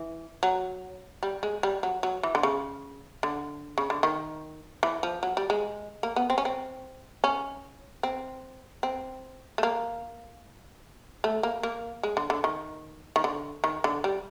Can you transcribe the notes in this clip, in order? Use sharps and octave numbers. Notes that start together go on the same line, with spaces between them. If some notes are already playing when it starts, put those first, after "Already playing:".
Already playing: E3
F#3
G3
G#3
G3
F#3
F#3
E3
D3
C#3
D3
C#3
D3
D#3
E3
F3
F#3
G3
G#3
A#3
B3
C4
C#4
C4
C#4
C4
C4
A3
A#3
A3
A#3
A#3
G#3
D3
D3
D#3
D#3
D3
D#3
D3
G3